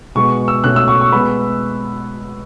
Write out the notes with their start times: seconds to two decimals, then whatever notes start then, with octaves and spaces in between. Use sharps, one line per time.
0.15 B2 G#3 B3 C#6
0.48 E6
0.64 B2 A3 C#4 F#6
0.76 E6
0.88 C#6
1.01 C#6
1.12 G#3 B3 B5